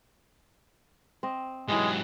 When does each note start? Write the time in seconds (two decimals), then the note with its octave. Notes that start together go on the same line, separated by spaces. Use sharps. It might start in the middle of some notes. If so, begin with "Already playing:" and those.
1.23 C4 D#5
1.68 G#2 E3 F#3 G#3 G4